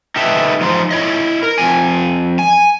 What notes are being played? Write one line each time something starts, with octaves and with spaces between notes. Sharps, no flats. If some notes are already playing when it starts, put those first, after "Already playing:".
D#4 G4 A4 B4 E5
F3 D#4 C5
E4 C#5 D#5
A#4
F2 G#5
G#5